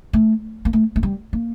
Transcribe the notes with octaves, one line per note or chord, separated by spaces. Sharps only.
A3
A#3
A3
A3
G3
A#3